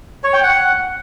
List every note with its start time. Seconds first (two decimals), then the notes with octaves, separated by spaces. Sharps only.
0.24 C#5
0.33 G5
0.43 F#5